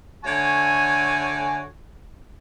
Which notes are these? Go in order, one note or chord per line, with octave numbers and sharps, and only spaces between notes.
D3 A3 F#4 C#5 G#5